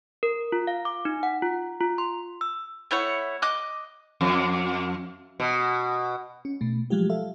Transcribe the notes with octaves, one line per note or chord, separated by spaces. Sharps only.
A#4
F4
F5
D6
D#4
F#5
F4
F4
C6
E6
A3 E4 C#5 F#5
D#5 D6 F#6
F2
B2
C#4
B2 A3
F3 F#3 G#3 F4 G4
A4 E5 F5